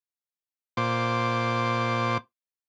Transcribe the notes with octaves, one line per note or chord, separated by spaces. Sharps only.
A#2 C5 D6